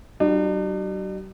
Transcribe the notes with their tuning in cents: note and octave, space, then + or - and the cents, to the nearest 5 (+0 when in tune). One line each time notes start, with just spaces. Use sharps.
G3 -45 D4 +45 F4 +20